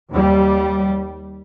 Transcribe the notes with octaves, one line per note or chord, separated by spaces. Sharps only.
D#2 G3